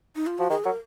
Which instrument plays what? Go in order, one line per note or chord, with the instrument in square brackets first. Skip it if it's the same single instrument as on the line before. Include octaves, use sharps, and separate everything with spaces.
[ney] D#4
F4
[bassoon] F3 [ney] F#4
[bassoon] D#3 [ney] G#4
[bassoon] F#3 [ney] A#4